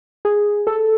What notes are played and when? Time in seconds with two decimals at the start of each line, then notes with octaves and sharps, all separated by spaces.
0.25 G#4
0.67 A4